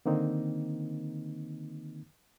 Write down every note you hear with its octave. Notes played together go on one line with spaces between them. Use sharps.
D3 D#3 A#3 C4 D#4